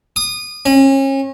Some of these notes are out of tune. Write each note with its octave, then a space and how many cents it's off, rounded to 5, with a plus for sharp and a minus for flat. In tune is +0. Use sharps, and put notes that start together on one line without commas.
D#6 -25
C#4 -35